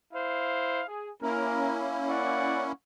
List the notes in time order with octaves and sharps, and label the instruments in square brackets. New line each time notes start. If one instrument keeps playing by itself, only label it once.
[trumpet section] E4 C5 F5
G#4
[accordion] A#3 C#4 E4 [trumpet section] A#4
[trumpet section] D5 F#5 C#6